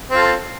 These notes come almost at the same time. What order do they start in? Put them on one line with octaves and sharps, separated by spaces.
C4 F4 A4